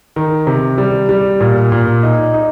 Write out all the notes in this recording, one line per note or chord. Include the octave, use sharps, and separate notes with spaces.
D#3
C3
G3
G3
A#2
A#2
D#4
D#4